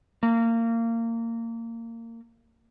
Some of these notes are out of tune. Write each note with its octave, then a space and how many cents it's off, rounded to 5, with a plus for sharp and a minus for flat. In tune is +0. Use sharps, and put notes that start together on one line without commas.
A#3 -25